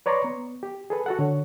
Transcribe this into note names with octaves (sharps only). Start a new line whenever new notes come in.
B4 C#5 D5 A#5 C6 C#6
B3
G4
G#4 A4 B4
F#4 A4 F#5
D3 C#5